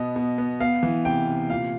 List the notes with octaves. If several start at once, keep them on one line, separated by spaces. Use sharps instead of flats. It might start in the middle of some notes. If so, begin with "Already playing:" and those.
Already playing: B2 B3 D#5
B2
B3
B3 F5
E3
C3 G5
C3
A#2 F5